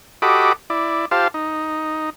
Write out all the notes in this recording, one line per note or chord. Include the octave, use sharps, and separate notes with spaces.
F#4 G4 A4 D#5 B5 D6
E4 D5
F4 G4 C5 F5 A5
D#4